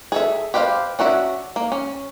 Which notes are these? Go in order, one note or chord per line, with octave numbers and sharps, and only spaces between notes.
G#4 A4 E5
G4 B4 C5 D#5 F5
C#4 D4 F#4 E5
A#3
C#4